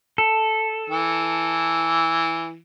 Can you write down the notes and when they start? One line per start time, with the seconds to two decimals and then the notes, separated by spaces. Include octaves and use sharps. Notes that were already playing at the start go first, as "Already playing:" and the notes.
0.18 A4
0.90 E3